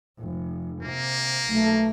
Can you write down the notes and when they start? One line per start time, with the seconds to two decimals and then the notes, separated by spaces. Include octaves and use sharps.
0.19 F1
0.82 C3 A#3
1.48 B1 A3